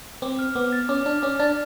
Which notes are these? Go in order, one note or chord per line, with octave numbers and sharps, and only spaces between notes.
C4 D6
F6
B3 D6
A6
C#4 D6
D4 F6
C#4 D6
D4 A6